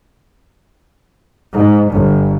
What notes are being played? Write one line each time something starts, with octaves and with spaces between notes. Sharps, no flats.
G#2
G1